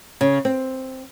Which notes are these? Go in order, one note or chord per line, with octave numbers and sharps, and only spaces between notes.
C#3
C4